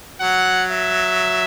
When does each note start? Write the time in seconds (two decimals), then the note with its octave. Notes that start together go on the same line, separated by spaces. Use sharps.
0.21 F#3 F#5
0.71 E5